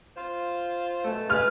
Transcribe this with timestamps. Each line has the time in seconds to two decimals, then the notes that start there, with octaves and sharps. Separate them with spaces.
0.15 F4 C5
1.04 F#2 B2 A3
1.30 G#3 B4 F6